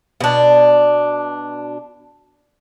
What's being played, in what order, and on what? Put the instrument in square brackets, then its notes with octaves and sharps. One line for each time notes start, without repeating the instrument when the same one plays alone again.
[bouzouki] B2 D4